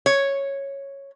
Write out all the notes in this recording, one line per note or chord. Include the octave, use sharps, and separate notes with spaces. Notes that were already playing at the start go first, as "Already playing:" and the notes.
C#5